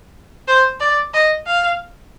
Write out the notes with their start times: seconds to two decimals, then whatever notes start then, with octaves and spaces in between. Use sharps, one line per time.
0.48 C5
0.80 D5
1.13 D#5
1.46 F5